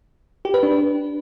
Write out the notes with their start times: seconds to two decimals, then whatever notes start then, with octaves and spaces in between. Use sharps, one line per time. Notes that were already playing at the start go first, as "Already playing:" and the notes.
0.45 G4
0.54 B4
0.63 D4